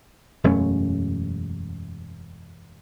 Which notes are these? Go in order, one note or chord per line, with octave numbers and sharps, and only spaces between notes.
E1 F#2 A3 C#4